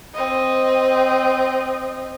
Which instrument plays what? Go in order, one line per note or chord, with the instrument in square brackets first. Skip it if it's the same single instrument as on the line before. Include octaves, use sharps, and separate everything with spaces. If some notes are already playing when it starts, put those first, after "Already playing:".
[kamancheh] C4 D#5